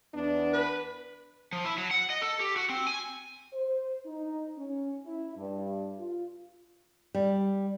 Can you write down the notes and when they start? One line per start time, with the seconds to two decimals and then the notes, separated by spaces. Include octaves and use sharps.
0.14 E2 B3 D4
0.52 B4
1.52 F3
1.64 E4
1.78 F#3
1.91 F#5
2.10 D#5
2.22 A4
2.40 G4
2.56 F#4
2.69 C4
2.87 G#5
3.53 C5
4.06 D#4
4.58 C#4
5.06 E4
5.36 G2
6.00 F4
7.15 G3